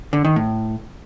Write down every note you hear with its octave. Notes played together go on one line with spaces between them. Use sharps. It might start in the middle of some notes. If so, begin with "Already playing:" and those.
D3
D#3
A2